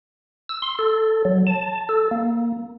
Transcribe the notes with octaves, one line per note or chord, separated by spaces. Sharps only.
E6
C6
A4
F#3
A5
A4
A#3